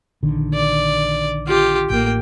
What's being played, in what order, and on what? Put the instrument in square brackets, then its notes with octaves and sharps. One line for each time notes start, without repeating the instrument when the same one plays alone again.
[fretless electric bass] A#1 D3 D#3
[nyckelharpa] D5
F4 G4
[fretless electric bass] A1 [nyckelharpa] A#3 G5